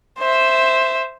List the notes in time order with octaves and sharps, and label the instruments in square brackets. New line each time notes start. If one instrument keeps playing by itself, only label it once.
[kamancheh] C5 E5